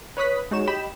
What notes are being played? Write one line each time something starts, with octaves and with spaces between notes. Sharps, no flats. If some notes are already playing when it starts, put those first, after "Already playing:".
B4 C#5 B5 D#6 F#6 B6
G#3 D#4 F#4 C#5 E7
G4 D#5 G5 B5 E7